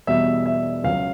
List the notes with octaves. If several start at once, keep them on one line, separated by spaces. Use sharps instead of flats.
E2 B2 G3 E5
E5
C#2 C#3 F#3 F5